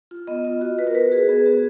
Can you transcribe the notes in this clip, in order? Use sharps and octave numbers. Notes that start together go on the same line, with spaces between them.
F4
B3 D#5
F4
F#4 D#5
F#4 B4
A#4
F#4 B4
F#4 G#4
B3 G#4
B3 F#4